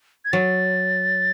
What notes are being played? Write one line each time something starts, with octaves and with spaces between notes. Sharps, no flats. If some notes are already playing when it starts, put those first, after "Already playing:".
G#6
F#3 A6